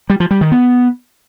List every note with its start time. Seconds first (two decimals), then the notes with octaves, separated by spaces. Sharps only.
0.10 G3
0.20 F3
0.31 G3
0.41 D#3
0.52 B3